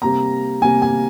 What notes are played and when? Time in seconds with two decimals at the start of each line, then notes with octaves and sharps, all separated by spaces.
0.02 C3 G3 A#3 A#5
0.62 C3 G3 A#3 G#5
0.82 G#5